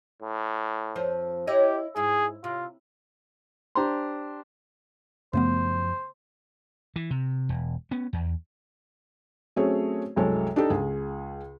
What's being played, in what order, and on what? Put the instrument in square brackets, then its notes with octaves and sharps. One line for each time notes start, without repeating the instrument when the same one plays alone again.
[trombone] A2
[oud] F2 F3 C5
[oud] E4 C#5 D#5 [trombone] G4
[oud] G#2 E4 [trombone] G#4
[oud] C3 [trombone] F4
[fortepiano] D4 G4 C5 A#5 C6
[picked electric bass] F#2 F3 [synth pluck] C#3 A3 B3 [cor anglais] C5
[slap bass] E3
C3
E1
B3 C#4
E2
[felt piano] F#3 A3 C4 C#4 G#4 C#5
C2 F#2 G#3 A4 C#5
D4 D#4 G4 A4
C#2 G#4